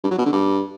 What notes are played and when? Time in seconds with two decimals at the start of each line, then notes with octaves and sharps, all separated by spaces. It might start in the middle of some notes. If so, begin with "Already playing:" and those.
0.04 G2
0.11 F#3
0.18 B2
0.25 D3
0.33 G2